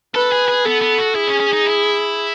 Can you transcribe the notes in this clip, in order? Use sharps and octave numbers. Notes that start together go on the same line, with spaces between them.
A4 B4
G#4
G#4
B3 A4
B3
F#4
E4 G#4
C#4
C#4
D#4
E4